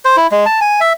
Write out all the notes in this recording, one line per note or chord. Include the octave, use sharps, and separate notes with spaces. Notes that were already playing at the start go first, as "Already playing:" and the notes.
C5
E4
G#3
A5
G#5
E5